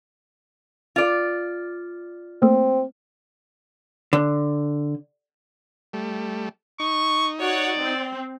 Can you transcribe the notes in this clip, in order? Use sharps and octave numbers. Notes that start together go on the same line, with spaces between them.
F4 D5
A3 A#3 C4
D3
G3 A3
D#4 C#6
F#4 C#5 D5 F#5
C4